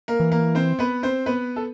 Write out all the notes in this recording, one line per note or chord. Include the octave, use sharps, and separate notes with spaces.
A#3 A#4
E3
A#3 A#4
C4 C5
B3 B4
C4 C5
B3 B4
A4